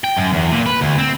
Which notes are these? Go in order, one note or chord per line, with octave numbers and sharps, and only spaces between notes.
G5
F#2
E2
A#2
B4
D2
C4